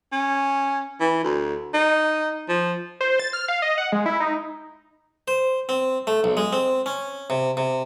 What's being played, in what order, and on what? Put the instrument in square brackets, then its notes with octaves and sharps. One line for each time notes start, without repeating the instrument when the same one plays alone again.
[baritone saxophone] C#4
E3
D2
D#4
F3
[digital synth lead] C5
A6
F6
F5
D#5
F#5
G#3
E4
D#4
[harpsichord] C5
C4
A3
B1
G#3
C4
C#4
C3
C3